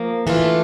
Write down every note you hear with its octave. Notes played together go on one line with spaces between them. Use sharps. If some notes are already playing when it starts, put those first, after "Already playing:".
Already playing: F3 A#3
E3 A3 D4 F4